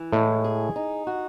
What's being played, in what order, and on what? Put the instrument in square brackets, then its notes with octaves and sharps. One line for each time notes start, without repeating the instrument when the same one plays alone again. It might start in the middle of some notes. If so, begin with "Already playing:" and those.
Already playing: [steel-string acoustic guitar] E3
[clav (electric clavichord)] A2 [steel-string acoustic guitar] G#3
[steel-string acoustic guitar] G#4
D#4
F#4